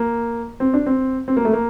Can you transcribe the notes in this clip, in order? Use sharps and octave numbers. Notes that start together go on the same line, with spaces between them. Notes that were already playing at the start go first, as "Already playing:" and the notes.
Already playing: A#3
C4
D4
C4
C4
A#3
A3
A#3